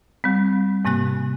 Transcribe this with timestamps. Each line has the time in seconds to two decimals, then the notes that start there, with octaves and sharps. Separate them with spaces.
0.24 G3 C4
0.85 G#2 C3 A#3 G#5 F#6